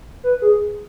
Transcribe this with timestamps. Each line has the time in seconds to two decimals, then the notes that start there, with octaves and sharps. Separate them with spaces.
0.24 B4
0.42 G#4